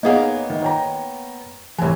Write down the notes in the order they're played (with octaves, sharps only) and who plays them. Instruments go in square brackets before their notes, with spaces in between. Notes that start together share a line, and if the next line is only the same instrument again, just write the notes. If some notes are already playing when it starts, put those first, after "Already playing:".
[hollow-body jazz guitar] A#3 B3 F5 [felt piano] D#4 G#4 C#5
[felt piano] D#3
C#5 G5 A#5
[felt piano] C2 G#5 [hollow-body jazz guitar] A2 E3